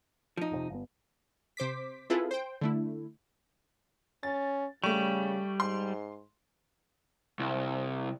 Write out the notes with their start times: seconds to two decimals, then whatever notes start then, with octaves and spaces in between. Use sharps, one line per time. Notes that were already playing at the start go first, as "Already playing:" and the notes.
0.37 F3 D#4
0.51 F1 A2 C3
0.70 G1 B3
1.57 C3 C5 D6 B6
2.10 C4 E4 F4 G#4 A4 B4
2.31 C5 G5
2.61 D3 A3 E4
4.23 C#4 A6
4.84 C#3 G3 A3 C#6
5.60 G#2 C6
7.39 C2